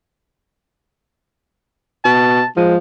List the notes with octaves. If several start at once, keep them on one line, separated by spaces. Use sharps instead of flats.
B2 A5
F3 G#3